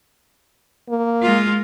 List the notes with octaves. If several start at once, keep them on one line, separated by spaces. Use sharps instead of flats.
A#3
G#3 F4